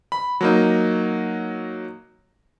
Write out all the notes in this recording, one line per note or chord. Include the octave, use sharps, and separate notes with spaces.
B5
F#3 A#3 D#4